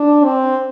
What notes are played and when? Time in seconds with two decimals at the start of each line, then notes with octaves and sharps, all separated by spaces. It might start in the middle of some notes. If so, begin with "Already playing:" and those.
Already playing: D4
0.25 C4